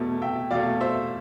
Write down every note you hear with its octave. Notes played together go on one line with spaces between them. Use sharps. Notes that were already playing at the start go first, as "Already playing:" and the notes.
Already playing: E2 B2 A3
E5 G5
E2 B2 A3 D5 F5
C5 E5